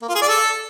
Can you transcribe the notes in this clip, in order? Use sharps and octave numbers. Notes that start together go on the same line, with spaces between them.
A#3
F4
G#4
D5
A4